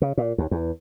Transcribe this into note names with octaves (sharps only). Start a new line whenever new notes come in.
C#3
A#2
D#2
E2